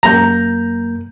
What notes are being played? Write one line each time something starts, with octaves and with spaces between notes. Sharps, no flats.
F#2 A#3 A#5 G6